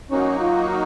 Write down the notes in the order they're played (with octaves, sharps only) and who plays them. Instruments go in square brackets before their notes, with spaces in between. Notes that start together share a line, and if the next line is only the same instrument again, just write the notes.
[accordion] F#3 A#3 D#4 F#4 [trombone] C#4
[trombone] F4